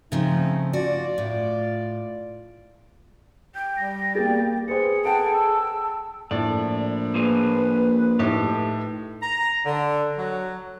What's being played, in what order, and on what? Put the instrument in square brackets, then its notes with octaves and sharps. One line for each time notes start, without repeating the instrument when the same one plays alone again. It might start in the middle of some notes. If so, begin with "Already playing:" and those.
[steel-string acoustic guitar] C#3 F3 [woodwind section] A3 C4 D#4
[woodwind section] F4 D5 [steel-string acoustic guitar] F#4
[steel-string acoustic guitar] A2
[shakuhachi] G5 [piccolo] G6
[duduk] G3 [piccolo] A#6
[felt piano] A#3 G4 G#4 [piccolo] A6
[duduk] G#4 [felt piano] B4 C5 [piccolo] C#7
[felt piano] A4 F#5 G5 [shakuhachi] A5 [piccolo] D7
[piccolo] E6
[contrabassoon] A#1 [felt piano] A2 [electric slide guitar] D5
[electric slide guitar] A#3 F4 G#4 [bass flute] B4
[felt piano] A2 A3 D#4 [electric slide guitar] G4
[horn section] A#5
D3
F#3